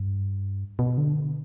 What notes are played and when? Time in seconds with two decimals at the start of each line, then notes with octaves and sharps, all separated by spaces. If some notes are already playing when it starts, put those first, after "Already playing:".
Already playing: G2
0.79 B2
0.98 D3